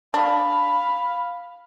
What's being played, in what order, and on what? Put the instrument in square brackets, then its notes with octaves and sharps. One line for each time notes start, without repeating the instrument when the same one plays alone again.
[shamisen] D4 [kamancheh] F5 B5